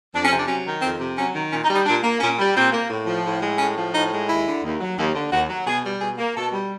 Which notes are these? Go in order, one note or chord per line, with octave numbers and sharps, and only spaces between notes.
F2 D4
C#4
C3
D4
F#3 C#4
D#3
F2 C4
C3
F#3 C#4
D#3
A#2 C#4
D#4
G3
D#4
A#2 D4
A#3
A#2 C#4
G3
A#2 C4
A#3
A2
F3
A2
G#3
A2 C#4
F3
A2 D#4
G#3
D#2 E4
D3
D#2
F#3
D#2
D3
D#2 F#4
F#3
B2 G#4
G3
B2 G#4
A#3
B2 A4
G3